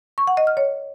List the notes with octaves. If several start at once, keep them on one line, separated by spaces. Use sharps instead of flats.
C#6
F#5
D#5
F6
C#5